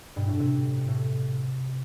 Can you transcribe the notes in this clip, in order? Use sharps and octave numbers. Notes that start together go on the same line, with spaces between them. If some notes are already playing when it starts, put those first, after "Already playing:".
G2 B2
A2
A2 C3
A2